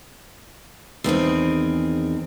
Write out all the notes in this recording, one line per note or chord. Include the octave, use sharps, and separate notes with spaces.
E2 D#3 C4 G#4